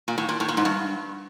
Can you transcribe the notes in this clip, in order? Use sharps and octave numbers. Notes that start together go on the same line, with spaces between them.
A#2
A2
A#2
A2
A#2
G#2
G2